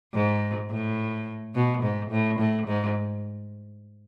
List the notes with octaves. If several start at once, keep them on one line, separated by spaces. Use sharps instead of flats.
G#2
A2
B2
G#2
A2
A2
G#2